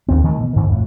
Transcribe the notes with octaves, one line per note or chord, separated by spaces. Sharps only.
D#2 C4
D#3 E3 G#3 A3
B2
G#2 D#3 E3
F2 A2